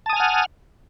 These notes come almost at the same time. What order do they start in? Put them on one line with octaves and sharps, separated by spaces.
A5 D#6 G#5 F6 F#5